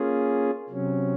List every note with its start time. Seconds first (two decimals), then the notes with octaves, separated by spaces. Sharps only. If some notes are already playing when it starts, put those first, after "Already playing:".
Already playing: A#3 C#4 F4 G#4
0.69 C3 F#3 C#4